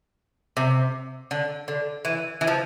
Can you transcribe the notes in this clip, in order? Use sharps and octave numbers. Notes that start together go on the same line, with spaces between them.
C3
D3
D3
E3
E3
F3